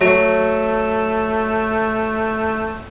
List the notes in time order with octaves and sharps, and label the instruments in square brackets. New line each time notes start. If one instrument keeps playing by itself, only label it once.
[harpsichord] F#3 [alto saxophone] A3